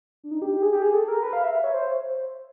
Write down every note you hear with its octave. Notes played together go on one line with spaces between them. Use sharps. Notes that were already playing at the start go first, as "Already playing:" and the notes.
D4
D#4
G4
G4
G#4
G4
G#4
A4
A#4
B4
F5
E5
E5
C#5
C5